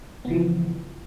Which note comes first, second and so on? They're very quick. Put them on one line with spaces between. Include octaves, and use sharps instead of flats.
B3 C#3 E3 F3